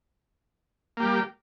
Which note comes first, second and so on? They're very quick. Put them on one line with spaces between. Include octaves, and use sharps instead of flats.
A#3 G4 G3